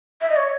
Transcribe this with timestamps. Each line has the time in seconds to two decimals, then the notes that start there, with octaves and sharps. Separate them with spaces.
0.21 E5
0.30 D#5
0.36 C#5